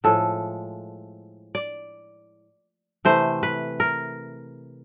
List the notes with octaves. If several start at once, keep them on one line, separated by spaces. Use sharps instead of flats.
A2 F3 G#3 A4
D5
C3 E3 A3 C5
B4
A#4